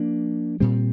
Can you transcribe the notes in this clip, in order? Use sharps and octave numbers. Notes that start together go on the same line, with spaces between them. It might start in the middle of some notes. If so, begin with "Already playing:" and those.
Already playing: F3 A#3 D4
A#2 G3 C4